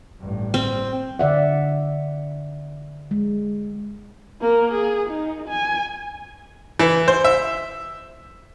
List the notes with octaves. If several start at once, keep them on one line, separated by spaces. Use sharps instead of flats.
A1 G2
C4
D3 D5 E5 F#5
G#3
A#3 A#4
G#4
D#4
G#5
E3
C5
E5